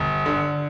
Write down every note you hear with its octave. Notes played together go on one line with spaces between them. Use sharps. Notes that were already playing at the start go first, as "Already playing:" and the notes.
Already playing: G1
D3